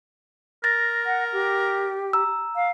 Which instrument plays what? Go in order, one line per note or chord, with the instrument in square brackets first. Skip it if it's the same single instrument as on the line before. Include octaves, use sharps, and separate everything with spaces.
[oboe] A#4 [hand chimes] A6 A#6
[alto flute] F#5
G4
[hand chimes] A#5 E6
[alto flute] F5